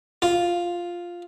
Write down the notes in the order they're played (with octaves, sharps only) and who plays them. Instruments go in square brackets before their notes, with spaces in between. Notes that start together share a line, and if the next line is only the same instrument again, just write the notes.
[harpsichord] F4